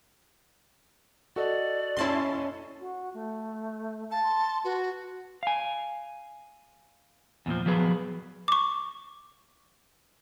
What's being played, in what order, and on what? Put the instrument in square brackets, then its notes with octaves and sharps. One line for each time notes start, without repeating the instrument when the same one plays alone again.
[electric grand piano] F#4 A4 D#5 [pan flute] D5
[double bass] C#4 [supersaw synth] E4 A5 C6
[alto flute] F#4
A3
[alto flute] F5 [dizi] A5
[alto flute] C6
[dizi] F#4 [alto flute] B4
[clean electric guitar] F5 G#5
E2 A#2 D3 F3
F3 F#3 B3 G#4 B4
[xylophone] C#6 D6